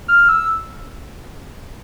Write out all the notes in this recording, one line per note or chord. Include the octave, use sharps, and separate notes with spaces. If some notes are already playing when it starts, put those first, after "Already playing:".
F6
E6